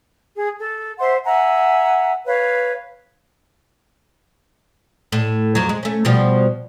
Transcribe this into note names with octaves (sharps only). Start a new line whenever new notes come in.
G#4
A4
C5 E5 F#5 C6
E5 F#5 G#5 A#5
B4 C#5 F5
A2
F2 F#3
G#3
A3 C#4
B2 F3 G3